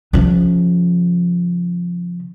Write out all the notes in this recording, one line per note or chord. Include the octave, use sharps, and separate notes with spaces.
C#3 F3